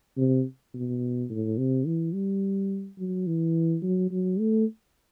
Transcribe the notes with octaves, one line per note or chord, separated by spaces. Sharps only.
C3
B2
A2
C3
E3
G3
F#3
E3
F#3
F#3
A3